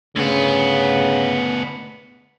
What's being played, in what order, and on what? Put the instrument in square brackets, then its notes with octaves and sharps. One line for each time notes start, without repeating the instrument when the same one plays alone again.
[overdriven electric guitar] D2 B3 [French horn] C#3